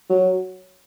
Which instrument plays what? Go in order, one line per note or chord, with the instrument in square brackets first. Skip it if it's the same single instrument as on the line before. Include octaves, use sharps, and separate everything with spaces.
[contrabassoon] F#3